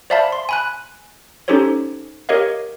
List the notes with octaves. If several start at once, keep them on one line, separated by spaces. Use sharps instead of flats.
C5 D5 E5 F5 A5 B5
C6
G#5 B5 F#6
C#4 D#4 G4 A4 C5 C#5
G4 A#4 C#5 D#5 F5